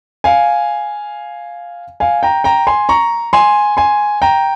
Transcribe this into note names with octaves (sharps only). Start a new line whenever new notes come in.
F5 G#5
F5 G#5
G5 A#5
G5 A#5
G#5 C6
A#5 C#6
G#5 C6
G#5 C6
G5 A#5